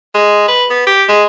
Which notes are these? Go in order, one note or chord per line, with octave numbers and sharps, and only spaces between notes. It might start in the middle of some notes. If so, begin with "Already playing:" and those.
G#3
B4
B3
G4
G#3